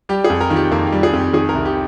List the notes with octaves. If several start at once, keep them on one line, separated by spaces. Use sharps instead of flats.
G3 G4
G#4
F2
A#4
D#3 F4
G4
F2 A#3
F4
G3
G#4
F2
G4
D#3 G#4
A#4
C2
G4